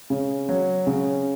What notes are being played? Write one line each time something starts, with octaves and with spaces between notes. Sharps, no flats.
C#3
F#3
C#3